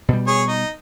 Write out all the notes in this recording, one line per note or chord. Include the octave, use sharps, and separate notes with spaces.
B2 G3
G#4 C#5
D#4